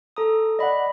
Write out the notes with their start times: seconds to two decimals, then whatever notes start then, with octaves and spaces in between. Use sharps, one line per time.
0.17 A4 A#5 D#6
0.59 D5 D#5 F#5 B5